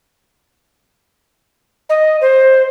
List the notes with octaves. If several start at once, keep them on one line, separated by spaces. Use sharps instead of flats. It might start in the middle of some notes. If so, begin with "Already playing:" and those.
D#5
C5